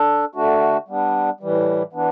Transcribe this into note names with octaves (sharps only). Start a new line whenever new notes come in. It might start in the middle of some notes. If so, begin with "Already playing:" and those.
Already playing: D4 A4
D3 A3 D4 F#4
G3 B3 D4
A2 E3 G3
E3 B3 D4